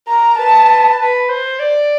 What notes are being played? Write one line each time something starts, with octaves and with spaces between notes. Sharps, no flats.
A#4 A#5
B4 A5
B4
C5
D5